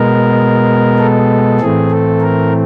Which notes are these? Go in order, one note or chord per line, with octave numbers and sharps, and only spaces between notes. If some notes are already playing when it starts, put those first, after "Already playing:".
Already playing: B2 G#3 B3 A#4
A4
A2 E3 A3 C4 G#4
A4
A#4